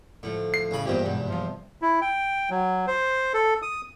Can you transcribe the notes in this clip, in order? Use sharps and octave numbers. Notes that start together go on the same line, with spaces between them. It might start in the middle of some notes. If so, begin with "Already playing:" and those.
A2 D3 F3 A3
C7
A1 C#3 C#4 B5
E2 G2 A#2 A#3 G4 C5 D#5
G#2 B2 G3
C3 F3 F4
E4
G5
F#3
C5
A4
D#6